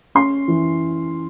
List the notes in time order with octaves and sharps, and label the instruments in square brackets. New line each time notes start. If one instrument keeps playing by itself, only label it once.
[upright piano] C#4 C6
E3